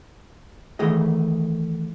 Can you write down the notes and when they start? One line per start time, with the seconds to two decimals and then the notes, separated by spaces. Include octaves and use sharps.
0.79 D#3 E3 A3 G#4 D#5